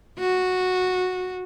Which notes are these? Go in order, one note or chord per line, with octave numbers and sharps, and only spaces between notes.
F#4